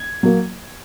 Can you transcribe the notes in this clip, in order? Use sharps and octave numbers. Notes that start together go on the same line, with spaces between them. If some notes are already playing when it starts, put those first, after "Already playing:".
Already playing: G#6
F#3 A#3